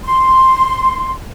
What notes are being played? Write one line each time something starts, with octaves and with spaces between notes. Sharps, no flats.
C6